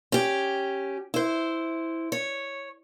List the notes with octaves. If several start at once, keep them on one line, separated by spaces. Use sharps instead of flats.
C#4 G4
E4 C5
C#5